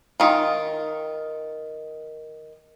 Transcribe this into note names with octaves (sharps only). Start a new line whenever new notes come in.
D#3 F4